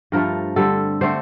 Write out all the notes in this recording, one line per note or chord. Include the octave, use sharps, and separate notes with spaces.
G2 F3 A3 A#4
D3 G3 C4 A4
D3 A3 C4 C5